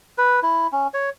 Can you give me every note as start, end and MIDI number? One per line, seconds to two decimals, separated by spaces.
0.18 0.40 71
0.43 0.67 64
0.72 0.87 61
0.94 1.10 73